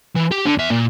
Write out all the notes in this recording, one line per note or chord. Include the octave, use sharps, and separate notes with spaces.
E3
G4
D3
E2 E5
A#2